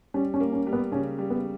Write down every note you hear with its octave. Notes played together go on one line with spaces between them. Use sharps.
G3 C#4
C#4
A#3
C#4
G3
B3
C#3 C#4
G3
B3